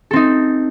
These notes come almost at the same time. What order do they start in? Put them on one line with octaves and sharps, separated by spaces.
A4 C4 D#4